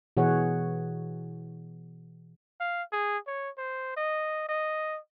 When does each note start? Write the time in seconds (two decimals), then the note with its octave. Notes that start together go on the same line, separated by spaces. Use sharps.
0.17 B2 E3 G#4 C#5 F#5
2.60 F5
2.92 G#4
3.27 C#5
3.58 C5
3.96 D#5
4.48 D#5